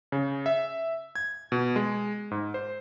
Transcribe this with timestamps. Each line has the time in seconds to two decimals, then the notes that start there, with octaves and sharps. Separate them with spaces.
0.12 C#3
0.46 E5
1.16 G#6
1.52 B2
1.76 G#3
2.31 G#2
2.54 C5